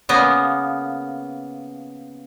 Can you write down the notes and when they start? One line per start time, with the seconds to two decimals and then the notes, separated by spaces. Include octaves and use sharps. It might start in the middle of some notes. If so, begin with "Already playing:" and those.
0.09 C#3 A#3 B3